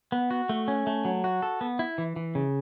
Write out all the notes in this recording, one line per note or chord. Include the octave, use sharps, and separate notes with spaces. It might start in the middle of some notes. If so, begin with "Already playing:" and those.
B3
F#4
A3
C#4
A3
F#3
F#4
A4
B3
E4
E3
E3
C#3